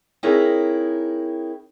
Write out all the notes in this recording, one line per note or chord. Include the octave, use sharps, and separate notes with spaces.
C4 D#4 E4 G#4 A#4 C#5